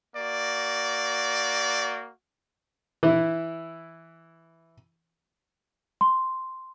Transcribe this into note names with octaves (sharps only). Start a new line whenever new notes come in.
A#3 F#4 D5
E3 E4
C6